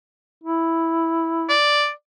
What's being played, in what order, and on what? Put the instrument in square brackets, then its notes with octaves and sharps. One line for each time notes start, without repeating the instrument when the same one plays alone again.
[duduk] E4
[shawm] D5